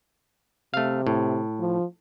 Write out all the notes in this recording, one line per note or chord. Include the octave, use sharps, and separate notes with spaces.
C3 A3 F5
A2
F3